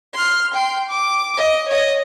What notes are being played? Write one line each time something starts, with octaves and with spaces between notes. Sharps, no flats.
C6 F6
G5 C6
D6
D#5
C#5 D#5